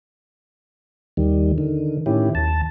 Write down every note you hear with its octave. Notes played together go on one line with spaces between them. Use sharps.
D#2 D#3 G3
D3 D#3
A2 D#3 C#4 E4 G4
D#2 A5